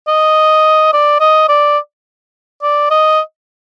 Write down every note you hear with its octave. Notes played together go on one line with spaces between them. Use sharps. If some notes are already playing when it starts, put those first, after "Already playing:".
D#5
D5
D#5
D5
D5
D#5